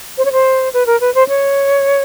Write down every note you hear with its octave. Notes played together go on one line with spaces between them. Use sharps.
C5
C#5
C5
B4
A#4
B4
C5
C#5